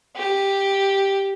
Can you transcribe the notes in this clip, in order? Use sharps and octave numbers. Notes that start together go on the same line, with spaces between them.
G4